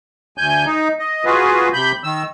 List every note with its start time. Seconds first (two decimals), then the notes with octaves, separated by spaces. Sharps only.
0.38 D2 G#5 G6
0.66 D#4
0.99 D#5
1.25 F4 F#4 G#4 B4
1.73 C3 B5 G6
2.04 D#3 E6